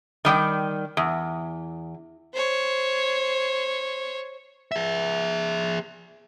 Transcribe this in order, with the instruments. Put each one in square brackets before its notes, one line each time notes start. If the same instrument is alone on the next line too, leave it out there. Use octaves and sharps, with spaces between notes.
[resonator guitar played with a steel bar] D#3 G3 G5
E2
[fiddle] C5 C#5
[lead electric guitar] G#4 E5